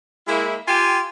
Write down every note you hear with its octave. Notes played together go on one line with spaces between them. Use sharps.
G#3 A#3 E4
F4 G4 G5 G#5